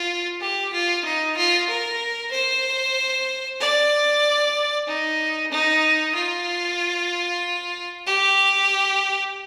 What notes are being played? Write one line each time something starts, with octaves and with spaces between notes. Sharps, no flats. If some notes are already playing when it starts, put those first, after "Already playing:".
Already playing: F4
G4
F4
D#4
F4
A#4
C5
D5
D#4
D#4
F4
G4